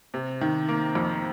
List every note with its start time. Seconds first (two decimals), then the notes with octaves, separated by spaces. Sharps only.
0.14 C3
0.41 D#3
0.68 A#3
0.95 F2